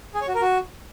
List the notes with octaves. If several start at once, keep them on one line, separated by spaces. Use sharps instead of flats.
G#4
C#5
F#4
A#4
F#4